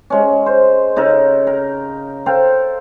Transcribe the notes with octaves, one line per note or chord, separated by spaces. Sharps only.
G#3 C#4
C5
C#3 D#4 A4 A#4
A#4
A4 C5 F5 G5